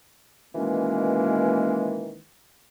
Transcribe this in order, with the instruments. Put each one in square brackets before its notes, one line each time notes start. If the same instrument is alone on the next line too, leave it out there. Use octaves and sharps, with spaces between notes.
[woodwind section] B2 D#3 E3 G#3 A#3 C#4